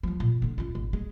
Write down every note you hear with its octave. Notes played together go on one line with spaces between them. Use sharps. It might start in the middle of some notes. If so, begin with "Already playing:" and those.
F3 F#3
A#2
D3 F4
F#2 F4
G#1
G#3